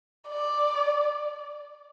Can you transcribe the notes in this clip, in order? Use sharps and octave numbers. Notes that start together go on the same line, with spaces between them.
D5